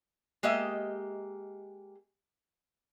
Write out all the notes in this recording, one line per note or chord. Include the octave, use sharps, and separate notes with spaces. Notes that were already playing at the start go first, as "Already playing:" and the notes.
G#3 A#3 G4 D#5 E5